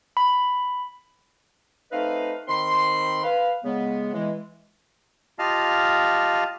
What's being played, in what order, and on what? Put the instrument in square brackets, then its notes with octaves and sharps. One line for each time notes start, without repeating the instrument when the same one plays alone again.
[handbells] B5
[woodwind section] A3 C4 D#4 B4 D#5 F5
D#3 C4 B5 C6
B4 F5
C#3 G#3 B3
E3 G#3
[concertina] F4 G4 D#5 F5 A5 F6